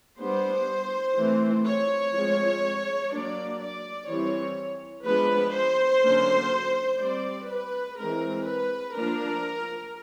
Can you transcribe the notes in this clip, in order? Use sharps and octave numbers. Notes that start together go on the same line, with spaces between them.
G3 B3 D4 C5
E3 A3 C4
C#5
F3 G#3 C4
F#3 A#3 D4 D5
D5
E3 G3 C4 C#5
F3 G#3 B3 D4 B4
C5
D3 F#3 A#3 C#4
G3 C4 D5
B4
E3 G#3 C4 A#4
B4
F3 A#3 D4 A#4